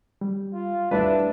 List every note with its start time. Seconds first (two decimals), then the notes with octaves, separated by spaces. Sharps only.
0.21 G3
0.54 F4
0.91 G3 A3 D4 E4 B4 E5